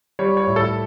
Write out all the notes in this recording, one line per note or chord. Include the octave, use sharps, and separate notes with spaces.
G3 C#5
C#5
A2
A4